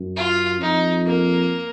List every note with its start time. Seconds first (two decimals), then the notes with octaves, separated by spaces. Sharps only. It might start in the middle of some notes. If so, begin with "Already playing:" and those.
Already playing: F#2
0.16 F4
0.61 F2 D#4
1.05 A#3